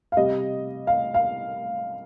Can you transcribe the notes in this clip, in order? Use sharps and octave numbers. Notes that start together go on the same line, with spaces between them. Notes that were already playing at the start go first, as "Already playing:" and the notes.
F5
C3 G3 D#5
F5
F5